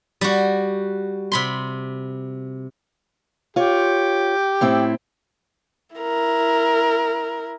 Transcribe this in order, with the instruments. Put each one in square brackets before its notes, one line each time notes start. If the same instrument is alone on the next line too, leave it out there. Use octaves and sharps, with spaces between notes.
[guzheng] G3 F#4
C3 B5 C6
[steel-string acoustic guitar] F4 C#5 [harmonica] G4
[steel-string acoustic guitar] A2 C4 E4
[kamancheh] E4 A#4